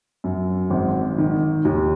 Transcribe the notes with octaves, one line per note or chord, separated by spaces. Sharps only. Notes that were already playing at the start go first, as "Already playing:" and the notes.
F#2
G#1
D#3
D#2